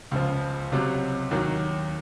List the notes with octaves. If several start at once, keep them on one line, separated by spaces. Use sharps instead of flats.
C#2 C#3 F3
C#2 C3 F#3
D#2 D#3 F#3